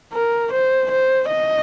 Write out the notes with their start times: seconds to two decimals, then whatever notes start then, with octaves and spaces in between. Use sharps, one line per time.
0.14 A#4
0.53 C5
0.91 C5
1.29 D#5